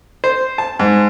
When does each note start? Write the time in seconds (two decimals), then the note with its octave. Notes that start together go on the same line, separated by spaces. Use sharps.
0.24 C5
0.58 A5
0.79 G#2